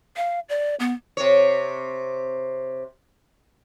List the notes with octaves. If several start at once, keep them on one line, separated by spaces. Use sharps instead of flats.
F5
D5
B3
C3 C#5